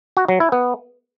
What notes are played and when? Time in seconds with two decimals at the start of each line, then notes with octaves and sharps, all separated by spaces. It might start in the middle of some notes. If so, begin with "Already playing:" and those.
0.17 F#4
0.28 F#3
0.40 E4
0.52 B3